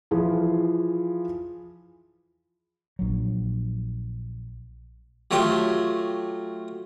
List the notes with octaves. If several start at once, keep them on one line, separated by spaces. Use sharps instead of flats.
E3 F3 F4 G#4
A#1 F#3
F#3 A3 F4 G4